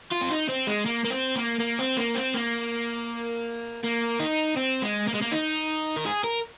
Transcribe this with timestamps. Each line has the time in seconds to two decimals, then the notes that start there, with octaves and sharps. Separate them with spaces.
0.11 F4
0.21 C4
0.30 D#4
0.49 C4
0.67 G#3
0.86 A#3
1.05 A#3
1.11 C4
1.36 A#3
1.60 A#3
1.79 C4
1.98 A#3
2.15 C4
2.34 A#3
3.84 A#3
4.20 D#4
4.57 C4
4.82 G#3
5.07 A#3
5.14 G#3
5.21 A#3
5.32 D#4
5.96 A#4
6.06 G#4
6.24 A#4